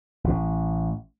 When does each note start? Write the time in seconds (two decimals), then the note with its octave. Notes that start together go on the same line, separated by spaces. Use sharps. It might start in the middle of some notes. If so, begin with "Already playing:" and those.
0.24 A1